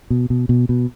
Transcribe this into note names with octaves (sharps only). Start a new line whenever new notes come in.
B2
B2
B2
B2